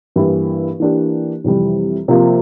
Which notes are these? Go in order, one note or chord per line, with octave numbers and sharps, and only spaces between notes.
G2 E3 A#3 E4 G4
E3 A#3 D4 G4
F2 C3 E3 G3
C3 F3 A#3 F4